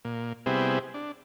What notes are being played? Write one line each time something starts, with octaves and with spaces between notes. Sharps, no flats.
A#2
C3 G3 B3 C4 E4 G#4
D4